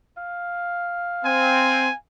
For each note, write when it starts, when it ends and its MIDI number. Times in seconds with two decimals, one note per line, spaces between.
0.17 1.95 77
1.25 1.88 60
1.25 1.95 80